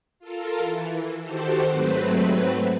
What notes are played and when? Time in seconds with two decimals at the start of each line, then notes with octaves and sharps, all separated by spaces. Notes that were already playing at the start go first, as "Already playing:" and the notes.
0.19 F4 A4 A#4
0.58 E3
1.22 D#3 F#4 G4 A4 C5
1.67 G#2 F#3 A3 C4 B4